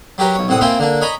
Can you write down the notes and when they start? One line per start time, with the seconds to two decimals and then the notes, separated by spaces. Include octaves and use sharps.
0.18 F#3 G4 A#4 B4 C#5
0.35 B1 C#5
0.48 C2 A2 C4 F#5 D#6
0.61 A#3 C4 E4 F4 G5 G#5
0.79 D3 A#3 D4
1.01 C#5 D#5 G#5 A#5 B5